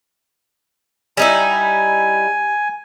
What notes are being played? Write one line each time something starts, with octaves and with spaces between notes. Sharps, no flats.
G3 D#4 E4 G#5